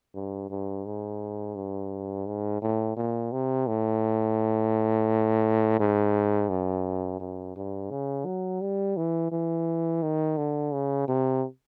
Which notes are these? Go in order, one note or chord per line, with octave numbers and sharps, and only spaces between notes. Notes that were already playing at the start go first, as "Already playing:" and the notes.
G2
G2
G#2
G2
G#2
A2
A#2
C3
A2
G#2
F#2
F#2
G2
C#3
F#3
G3
E3
E3
D#3
D3
C#3
C3